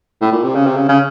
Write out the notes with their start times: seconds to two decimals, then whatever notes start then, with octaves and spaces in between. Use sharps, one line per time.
0.21 A2
0.32 A#2
0.44 C3
0.55 C#3
0.67 C3
0.77 C#3
0.89 C#3